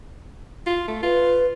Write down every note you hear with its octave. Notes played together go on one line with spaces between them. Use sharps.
F4
A3
F4 B4